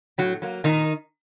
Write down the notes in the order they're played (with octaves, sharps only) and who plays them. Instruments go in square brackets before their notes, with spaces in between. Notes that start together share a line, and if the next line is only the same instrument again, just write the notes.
[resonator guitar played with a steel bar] A2 F#3 F#4
F#3 A#3
A#2 D#3 D#4